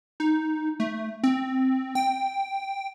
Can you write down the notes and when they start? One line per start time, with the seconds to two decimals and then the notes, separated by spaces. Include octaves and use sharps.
0.20 D#4
0.80 A3
1.23 C4
1.95 G5